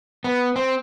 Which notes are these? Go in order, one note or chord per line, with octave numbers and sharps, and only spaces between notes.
B3
C4